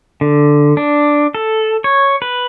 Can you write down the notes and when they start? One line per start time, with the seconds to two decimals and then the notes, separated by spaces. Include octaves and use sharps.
0.21 D3
0.77 D4
1.35 A4
1.84 C#5
2.22 B4